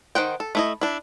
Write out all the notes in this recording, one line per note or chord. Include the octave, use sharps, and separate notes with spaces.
D#3 C5 F#5 G5
A4
A3 E4 D#5
D4 E4